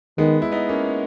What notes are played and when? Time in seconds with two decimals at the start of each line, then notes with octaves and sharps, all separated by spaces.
0.18 D#3 G#3 B3
0.42 E4
0.52 B3 D#4
0.69 A#3 C#4